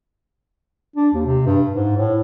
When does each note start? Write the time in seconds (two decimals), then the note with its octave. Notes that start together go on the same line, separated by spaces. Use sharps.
0.96 D4
1.14 D#2
1.26 C3
1.46 G2
1.72 G#2
1.97 A2